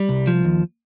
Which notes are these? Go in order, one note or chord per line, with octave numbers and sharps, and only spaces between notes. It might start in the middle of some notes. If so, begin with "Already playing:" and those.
Already playing: G3
C2
F3
D#2